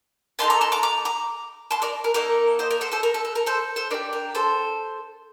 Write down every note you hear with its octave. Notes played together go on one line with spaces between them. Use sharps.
A#3 D#4 A4 A5 C6
A#5 D6
A5 C6
A#5 D6
A#5 D6
A#5 D6
A5 C6
A#4 D5
A#4
A#3 D#4 A4 A#4 D5
C5 D#5
A#4 D5
A4 C5
A4 C5
A#4
A4
A4
A#4
A4 C5
A4 C5
D4 G4 A#4 D5
A#4
A4 C5